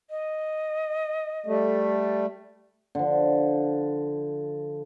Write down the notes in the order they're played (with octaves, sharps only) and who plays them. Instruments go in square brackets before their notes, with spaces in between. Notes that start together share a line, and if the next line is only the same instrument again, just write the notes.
[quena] D#5
[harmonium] G3 A3
[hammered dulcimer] D3 F3